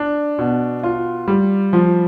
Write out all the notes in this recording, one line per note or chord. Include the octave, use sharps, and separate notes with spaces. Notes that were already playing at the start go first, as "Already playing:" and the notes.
Already playing: D4
B2
F4
G3
F3